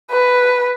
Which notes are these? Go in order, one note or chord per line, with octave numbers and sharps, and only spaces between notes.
B4